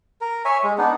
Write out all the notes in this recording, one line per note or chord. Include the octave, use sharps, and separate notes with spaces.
A#4
C#5 E5 G#5
G#3
B3 D4 D#4